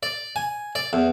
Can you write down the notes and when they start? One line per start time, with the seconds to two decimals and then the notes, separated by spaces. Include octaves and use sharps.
0.03 D5
0.36 G#5
0.75 D5
0.93 E2